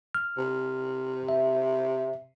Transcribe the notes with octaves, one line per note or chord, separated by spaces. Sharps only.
F6
C3
E5